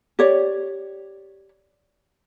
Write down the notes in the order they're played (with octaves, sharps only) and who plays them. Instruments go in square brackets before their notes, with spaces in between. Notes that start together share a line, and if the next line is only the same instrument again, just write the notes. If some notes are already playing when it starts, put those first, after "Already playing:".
[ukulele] G4 C#5 D5